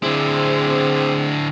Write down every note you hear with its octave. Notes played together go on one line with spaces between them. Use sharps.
D3 C4 E4 G#4